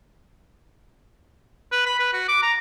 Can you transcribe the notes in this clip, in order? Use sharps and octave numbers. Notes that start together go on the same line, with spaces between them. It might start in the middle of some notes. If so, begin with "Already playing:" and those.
B4
B5
B4
F#4
D6
A#5